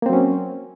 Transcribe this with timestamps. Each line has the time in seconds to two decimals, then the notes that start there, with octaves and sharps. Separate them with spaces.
0.02 A#3
0.06 C4
0.10 F#3
0.13 C#4